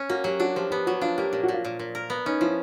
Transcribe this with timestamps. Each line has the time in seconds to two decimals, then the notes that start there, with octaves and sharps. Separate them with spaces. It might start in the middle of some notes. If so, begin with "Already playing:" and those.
Already playing: C#4
0.10 A#3 F#4
0.24 F#3 G4
0.40 D4 F#4
0.56 F3 G4
0.71 B3 G4
0.87 F#3 F#4
1.01 D4 F4
1.18 A#3 G4
1.33 A#2 G4
1.43 F#4
1.48 A#2 F4
1.65 A#2
1.79 A#2
1.95 A#4
2.10 B3
2.26 C#4 D#4
2.41 F3 E4